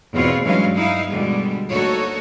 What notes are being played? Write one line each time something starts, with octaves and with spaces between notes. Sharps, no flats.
E2 B2 C4 F4 C#5
G2 E3 F#3 G#3 C#4 F5
D#4 E4 F5
B2 D3 G3 G#3
D2 A#3 D#4 F#4 A4 C#5